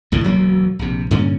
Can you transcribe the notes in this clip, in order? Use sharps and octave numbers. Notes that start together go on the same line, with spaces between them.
C2 A2 D3 D#3
E1 D2 F#3 A#3
A#1 C3
G2 A#2 D3 C#4